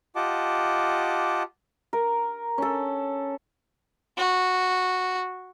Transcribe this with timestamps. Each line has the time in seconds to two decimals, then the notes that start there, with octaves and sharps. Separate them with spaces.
0.16 F4 G4 D#5 F#5 A5 D6
1.93 A#4
2.58 C#4 A4
4.17 F#4